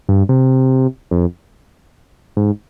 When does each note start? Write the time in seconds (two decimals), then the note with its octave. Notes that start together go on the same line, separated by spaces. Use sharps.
0.09 G2
0.29 C3
1.11 F2
2.37 G#2